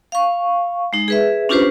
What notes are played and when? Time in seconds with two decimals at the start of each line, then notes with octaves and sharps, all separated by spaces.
0.12 F5 C#6
0.93 G#3 D#4
1.08 G#4 B4 E5
1.49 C#4 D4 F4 G4 B4 C5